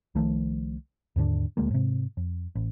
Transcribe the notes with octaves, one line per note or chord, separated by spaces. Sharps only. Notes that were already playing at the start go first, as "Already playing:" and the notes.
C2 D#3 F3 A3
D#2 G#2 D3 D4
D#1 D2 G#3 A#3
G#2 C3
F2
A1